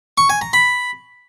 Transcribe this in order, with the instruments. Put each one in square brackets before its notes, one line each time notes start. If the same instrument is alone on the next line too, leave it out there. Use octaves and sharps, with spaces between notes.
[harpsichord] C#6
G#5
A#5
B5